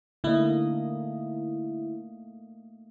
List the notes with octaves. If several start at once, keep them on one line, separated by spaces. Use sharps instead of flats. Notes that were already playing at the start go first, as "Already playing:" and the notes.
D3 A3 A#3 E4 D#5